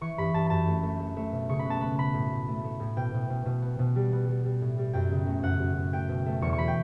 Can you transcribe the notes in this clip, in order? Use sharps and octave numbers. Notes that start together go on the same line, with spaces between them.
E3 C#6
G2 B5
G2 A5
F#2 A5
A3
A3
A3
A3
B2
C#3 C#6
B5
B3 A5
B3 B5
B3 B5
A2
A2
A3
A3
A2
B2 G5
B2
B2
B2
B3
B2
G3
B3
G3
G3
A2
G3
F#2 G5
C#3
A3
F#2 F#5
F#2
F#2
A3 G5
B2
A3
E2 C#6
C#6
F#3 B5
G5